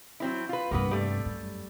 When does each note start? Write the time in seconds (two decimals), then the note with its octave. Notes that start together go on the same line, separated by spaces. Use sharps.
0.20 F#3 C4 E4
0.49 F4 B4
0.71 G2 C3 A#3 B3 B4
0.91 G3 A3
1.25 F#2